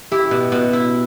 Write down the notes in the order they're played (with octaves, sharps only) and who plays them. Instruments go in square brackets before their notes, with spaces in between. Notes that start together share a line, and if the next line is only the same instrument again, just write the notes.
[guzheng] E4 [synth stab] G4
[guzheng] B2
B2
E4